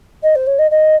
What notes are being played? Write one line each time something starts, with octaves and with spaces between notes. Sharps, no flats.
D#5
C5
C#5
D#5
D#5